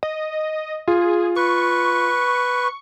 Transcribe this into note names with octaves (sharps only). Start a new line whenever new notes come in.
D#5
F4 G#4
B4 C#6